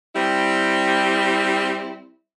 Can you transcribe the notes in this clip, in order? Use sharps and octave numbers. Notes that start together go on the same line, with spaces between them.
G3 C4 E4